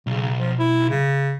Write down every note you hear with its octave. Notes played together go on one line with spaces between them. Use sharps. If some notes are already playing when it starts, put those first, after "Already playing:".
B1 C#3
F3
E4
C#3